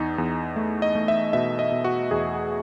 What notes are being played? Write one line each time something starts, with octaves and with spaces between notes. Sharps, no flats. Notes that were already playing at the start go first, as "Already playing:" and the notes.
Already playing: E2 D#4
E2
A3
D#5
A3
E5
B2 E5
D#5
B2
F#4
E2 G#4